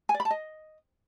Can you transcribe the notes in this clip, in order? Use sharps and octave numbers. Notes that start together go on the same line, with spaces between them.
G#5
D5
B5
A5
D#5